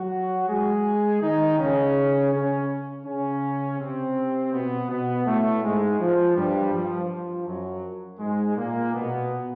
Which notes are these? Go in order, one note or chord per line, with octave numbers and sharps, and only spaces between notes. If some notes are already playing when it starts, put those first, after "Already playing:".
Already playing: F#3 F#4
G#3 G#4
D#3 D#4
C#3 C#4
C#3 C#4
C#3 C#4
C3 C4
B2 B3
B2 B3
A2 A3
G#2 G#3
F3
G2 G3
F3
F3
F#2 F#3
G#2 G#3
A#2 A#3
B2 B3